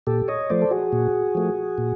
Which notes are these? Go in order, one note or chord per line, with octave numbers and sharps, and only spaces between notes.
A#2 G4 A4
C#5 D#5
F3 A3 C5 D5
A4
F#4 G#4
A#2
F3 A3
A#2